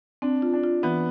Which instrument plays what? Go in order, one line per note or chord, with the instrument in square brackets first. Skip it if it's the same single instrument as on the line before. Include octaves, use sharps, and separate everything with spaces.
[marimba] C4 [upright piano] D4
[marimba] F4
[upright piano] D4
[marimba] F4
[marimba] E3 [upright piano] B3